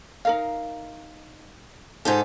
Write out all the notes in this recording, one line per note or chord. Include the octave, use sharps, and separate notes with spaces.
D#4 A#4 F5
G#2 D#4 G4 A4